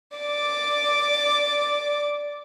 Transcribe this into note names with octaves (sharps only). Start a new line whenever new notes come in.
D5 D6